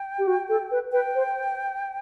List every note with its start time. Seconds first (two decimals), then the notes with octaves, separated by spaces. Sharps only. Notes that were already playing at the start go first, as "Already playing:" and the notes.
Already playing: G5
0.18 G4
0.27 F#4
0.49 A4
0.71 B4
0.92 B4 G5
1.15 C5